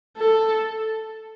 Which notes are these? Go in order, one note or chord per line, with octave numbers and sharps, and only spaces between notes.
A4